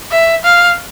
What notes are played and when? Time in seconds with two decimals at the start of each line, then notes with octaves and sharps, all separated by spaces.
0.11 E5
0.44 F5